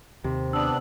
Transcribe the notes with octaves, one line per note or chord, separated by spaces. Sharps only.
D#2 C3
B3 D4 E6 F#7